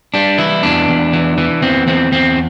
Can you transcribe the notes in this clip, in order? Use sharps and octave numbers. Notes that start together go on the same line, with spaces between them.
G3 D4
E3 E4
E2 D4
E2
E3
E3
E2 C4
E2 C4
E2 C4